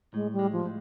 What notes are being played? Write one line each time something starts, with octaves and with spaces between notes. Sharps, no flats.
A2 G#3
G3
G#3
F3
A2